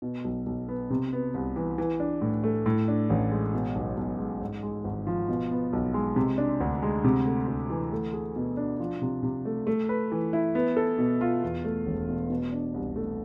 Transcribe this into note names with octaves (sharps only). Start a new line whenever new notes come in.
B2
B1
B1
B3
C3
B3
C2
E3
E3
D4
A2
A3
A2
D4
A1
G#3
B2
B1
B1
G#3
G#2
G#3
G#1
F3
B2
B3
B1
G#3
C3
D4
D2
G#3
C3
A3
D2
E3
A3
G#4
B2
D4
F3
C3
C3
A3
A3
B4
E3
E4
B3
A4
B2
F4
E2
A3
E1
B2
B2
D4
C2
A3